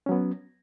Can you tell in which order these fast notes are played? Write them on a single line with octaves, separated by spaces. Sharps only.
C#4 F#3 B3